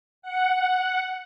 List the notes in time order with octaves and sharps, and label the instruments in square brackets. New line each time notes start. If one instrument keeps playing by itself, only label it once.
[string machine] F#5